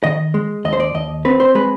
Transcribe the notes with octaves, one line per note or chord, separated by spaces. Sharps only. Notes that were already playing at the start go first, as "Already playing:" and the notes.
D#3 D#5
G#3
D#2 D#5
C5
D5
D#2 D#5
C4 B4
C5
G#3 B4